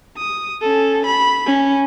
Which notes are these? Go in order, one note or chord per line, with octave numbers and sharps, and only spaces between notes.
D#6
C#4 A4
B5
C#4